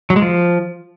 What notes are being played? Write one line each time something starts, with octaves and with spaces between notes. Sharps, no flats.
F#3
G#3
F3